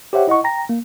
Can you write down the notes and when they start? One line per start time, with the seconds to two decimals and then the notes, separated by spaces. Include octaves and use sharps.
0.13 G4 C5 C#5 E5 F#5 G5
0.28 E4 D#5 F#5 C#6
0.44 G5 A#5 A#6
0.69 A#3